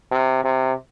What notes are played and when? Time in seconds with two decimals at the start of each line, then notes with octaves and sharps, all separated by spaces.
0.11 C3
0.44 C3